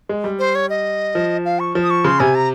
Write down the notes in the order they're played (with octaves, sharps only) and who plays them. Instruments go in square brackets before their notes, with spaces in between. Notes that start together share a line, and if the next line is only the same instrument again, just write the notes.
[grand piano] G#3
G3
[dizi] C5
C#5
D#5
[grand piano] F3
[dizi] F5
C#6
[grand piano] F3
[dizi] D#6
C#6
[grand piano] C#3 [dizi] C6
[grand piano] C3 [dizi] G#5
[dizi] A#5